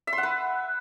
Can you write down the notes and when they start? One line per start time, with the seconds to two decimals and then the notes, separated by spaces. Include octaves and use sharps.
0.07 E5
0.13 C6
0.18 F#5
0.23 B4